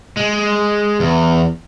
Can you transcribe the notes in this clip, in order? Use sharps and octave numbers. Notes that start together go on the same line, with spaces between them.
G#3
E2